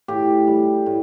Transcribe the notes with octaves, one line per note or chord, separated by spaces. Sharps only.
A2 G4
G3
A2